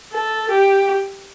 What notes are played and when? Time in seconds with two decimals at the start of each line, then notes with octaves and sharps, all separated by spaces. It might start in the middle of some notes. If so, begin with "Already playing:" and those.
0.13 A4
0.51 G4